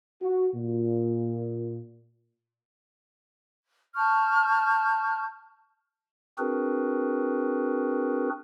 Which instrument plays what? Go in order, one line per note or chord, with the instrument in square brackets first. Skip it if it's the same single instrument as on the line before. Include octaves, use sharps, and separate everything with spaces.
[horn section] F#4
A#2
[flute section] A5 C#6 F6 G6
[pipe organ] C4 D4 F#4 G#4 A#4 B4